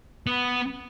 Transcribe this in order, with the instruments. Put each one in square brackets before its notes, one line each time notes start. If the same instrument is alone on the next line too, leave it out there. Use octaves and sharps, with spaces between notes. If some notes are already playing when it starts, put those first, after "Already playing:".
[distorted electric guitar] B3